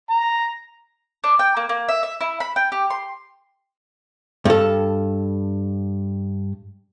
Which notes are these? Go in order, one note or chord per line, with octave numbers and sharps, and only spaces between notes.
A#5
D4
G5
A#3
A#3
E5
E5
E4
B5
G5
G4
C6
G2 A4